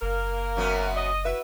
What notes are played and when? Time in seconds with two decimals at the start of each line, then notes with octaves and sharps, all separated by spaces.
0.02 F#1 A#3 A#4
0.57 F#2 F#3 B3
0.96 D#5
1.25 E4 F#4 B4 E5